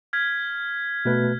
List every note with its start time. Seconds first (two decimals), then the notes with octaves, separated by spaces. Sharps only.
0.13 F6 G#6 B6
1.05 B2 A3 B4